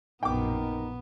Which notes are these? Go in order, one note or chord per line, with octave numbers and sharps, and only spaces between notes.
A#1 F#2 B2 B3 D#4 A#4 G5 D6